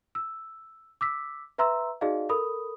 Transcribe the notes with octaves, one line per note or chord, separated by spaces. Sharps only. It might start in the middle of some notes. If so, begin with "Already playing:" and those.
E6
D6 E6 B6
B4 E5 A#5 C6 E6
D#4 F#4 G#4 D5 D#5 F5
A4 A#4 B5 D#6